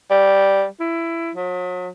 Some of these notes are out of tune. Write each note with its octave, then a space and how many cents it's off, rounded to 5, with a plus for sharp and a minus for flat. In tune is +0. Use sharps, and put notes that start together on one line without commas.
G3 -5
E4 +15
F#3 -40